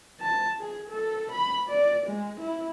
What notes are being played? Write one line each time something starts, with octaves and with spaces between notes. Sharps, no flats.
A5
G#4
A4
B5
D5
G#3
E4